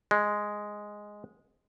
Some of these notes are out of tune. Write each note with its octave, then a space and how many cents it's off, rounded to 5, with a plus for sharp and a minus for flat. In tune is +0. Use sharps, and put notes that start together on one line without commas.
G#3 +0